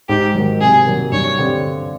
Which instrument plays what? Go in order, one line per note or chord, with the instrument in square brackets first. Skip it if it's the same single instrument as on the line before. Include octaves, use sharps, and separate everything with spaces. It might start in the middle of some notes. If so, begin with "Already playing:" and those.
[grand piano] G#2 [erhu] G4
[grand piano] D#3 F#3
[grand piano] C3 [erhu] G#4
[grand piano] D#3 F#3 A#3
[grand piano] G2 [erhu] C#5
[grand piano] D3 G3 C4